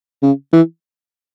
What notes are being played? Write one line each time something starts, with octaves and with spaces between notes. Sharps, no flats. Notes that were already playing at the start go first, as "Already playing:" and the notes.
C#3
E3